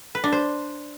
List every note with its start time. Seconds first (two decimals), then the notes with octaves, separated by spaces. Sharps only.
0.15 B4
0.24 D4
0.32 C5